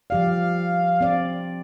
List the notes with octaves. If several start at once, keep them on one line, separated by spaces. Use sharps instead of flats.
F3 G4 D5 F5
C4 D5